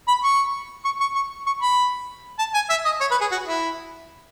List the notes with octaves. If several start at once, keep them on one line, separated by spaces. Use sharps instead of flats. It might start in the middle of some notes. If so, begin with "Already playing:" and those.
B5
C#6
C#6
C#6
C#6
C#6
B5
A5
G#5
E5
D#5
C#5
B4
G#4
F#4
E4